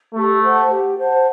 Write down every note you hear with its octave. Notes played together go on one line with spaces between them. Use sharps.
A3 G4
C5 F#5 A5
G4
C5 F#5 A5